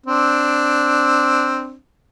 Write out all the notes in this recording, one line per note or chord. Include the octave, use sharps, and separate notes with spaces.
C4 D4